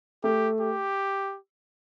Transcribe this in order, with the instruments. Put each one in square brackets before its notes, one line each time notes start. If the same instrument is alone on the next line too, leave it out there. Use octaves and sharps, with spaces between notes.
[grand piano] A3 [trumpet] G4
[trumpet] G4